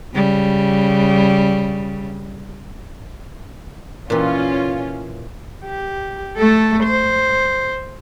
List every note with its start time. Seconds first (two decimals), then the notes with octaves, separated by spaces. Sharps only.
0.14 C#3 G3
4.10 A#2 E3 C#4 F4
5.65 G4
6.37 A3 A4
6.84 C5